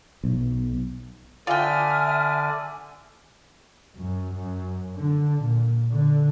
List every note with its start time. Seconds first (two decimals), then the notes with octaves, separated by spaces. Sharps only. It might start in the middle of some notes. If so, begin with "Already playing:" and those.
0.24 B1
1.47 D3 F4 D5 E5 G5 G#5 D#6 F6
3.98 F#2
4.35 F#2
4.95 D3
5.42 A#2
5.89 D3